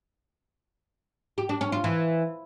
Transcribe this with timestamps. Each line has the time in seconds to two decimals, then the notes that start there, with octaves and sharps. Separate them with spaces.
1.38 G4
1.49 D4
1.61 C#4
1.72 F4
1.84 E3